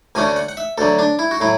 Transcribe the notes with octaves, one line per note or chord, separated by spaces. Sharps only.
D2 D3 A3 C#4 G#5
F#5
F#5
E5
D2 D3 F#3 A4
D4
E4
F#4
A2 F#3 E4